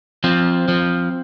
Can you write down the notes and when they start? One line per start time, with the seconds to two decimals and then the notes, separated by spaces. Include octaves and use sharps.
0.24 F3 C4
0.68 F3